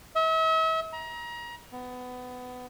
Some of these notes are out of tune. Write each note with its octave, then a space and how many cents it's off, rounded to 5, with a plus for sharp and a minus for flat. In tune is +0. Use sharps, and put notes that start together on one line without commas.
E5 -40
A#5 +30
B3 +20